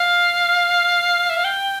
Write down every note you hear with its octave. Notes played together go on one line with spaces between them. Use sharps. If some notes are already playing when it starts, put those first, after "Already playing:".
Already playing: F5
E5
F5
G5